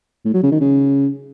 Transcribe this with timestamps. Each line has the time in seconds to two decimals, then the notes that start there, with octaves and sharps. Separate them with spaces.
0.25 A2
0.34 F#3
0.43 C#3
0.52 D#3
0.61 C#3